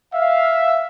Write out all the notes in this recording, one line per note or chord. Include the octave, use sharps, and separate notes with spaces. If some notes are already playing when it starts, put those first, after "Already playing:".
E5 F5